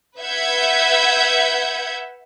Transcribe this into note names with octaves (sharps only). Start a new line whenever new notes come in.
B4 E5 F#5 G6 G#6